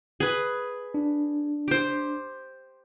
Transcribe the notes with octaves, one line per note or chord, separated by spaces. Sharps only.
G#4 B4
D4
G4 C5